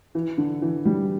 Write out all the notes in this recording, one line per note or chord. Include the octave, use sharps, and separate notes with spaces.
E3
D3
E3
G3